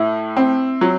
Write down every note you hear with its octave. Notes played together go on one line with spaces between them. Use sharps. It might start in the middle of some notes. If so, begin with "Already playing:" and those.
Already playing: A2 E4
C4
F#3